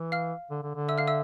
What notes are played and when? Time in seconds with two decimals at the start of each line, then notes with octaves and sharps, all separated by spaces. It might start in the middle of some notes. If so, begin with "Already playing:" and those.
Already playing: E3
0.12 F5 F6
0.50 D3
0.63 D3
0.76 D3
0.89 E5 E6
0.98 F5 F6
1.08 E5 E6